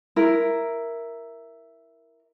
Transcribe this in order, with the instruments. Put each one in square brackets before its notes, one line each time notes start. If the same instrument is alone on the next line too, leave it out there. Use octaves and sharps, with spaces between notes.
[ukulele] E4 A#4